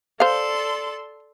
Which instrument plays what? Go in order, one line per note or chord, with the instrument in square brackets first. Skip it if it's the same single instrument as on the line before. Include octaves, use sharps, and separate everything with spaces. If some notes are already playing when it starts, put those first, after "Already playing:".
[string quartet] A4 D5 C6 [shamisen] C5 F5